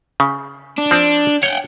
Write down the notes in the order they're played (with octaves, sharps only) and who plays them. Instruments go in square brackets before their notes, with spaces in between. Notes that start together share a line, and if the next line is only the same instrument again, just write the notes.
[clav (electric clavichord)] C#3
[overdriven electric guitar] D4
[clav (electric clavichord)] F3 C4
[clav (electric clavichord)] C#5 [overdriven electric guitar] F#5 G5